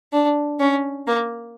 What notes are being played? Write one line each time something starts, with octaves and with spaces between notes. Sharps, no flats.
D4
C#4
A#3